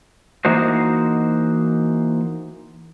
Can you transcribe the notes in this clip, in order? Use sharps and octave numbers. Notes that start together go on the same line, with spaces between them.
E3 A#3 D#4 F#4 C5